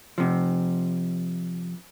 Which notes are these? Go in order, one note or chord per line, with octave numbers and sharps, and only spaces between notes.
C3 F3